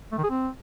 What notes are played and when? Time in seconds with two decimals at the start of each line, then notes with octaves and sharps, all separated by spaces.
0.12 A3
0.18 D#3
0.24 G#4
0.30 C4